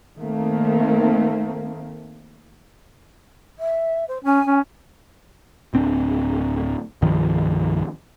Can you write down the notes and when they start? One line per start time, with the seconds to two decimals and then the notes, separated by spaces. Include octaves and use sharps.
0.19 D#3 A3 A#3 C4
3.59 E5
4.08 C5
4.24 C#4 G#5
4.46 C#4
5.73 D1 C4 D4
7.02 C2 G2 D#3 F3